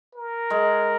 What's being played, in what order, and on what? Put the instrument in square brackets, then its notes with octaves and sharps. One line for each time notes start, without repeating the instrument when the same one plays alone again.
[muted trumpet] A#4
[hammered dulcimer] G#3